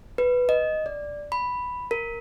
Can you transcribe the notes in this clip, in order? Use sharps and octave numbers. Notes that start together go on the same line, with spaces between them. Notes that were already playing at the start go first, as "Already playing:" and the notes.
B4
D#5
D5
B5
A#4